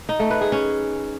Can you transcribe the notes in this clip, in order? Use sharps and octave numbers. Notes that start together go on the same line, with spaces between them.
D#4
A3
B4
G#4
C#4